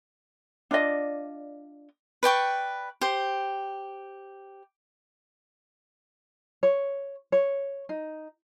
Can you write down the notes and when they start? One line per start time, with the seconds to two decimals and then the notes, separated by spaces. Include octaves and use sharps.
0.71 D4 F4 D5 D#5
2.23 B4 D5 G5 C#6
3.01 G4 C5
6.63 C#5
7.32 C#5
7.89 D#4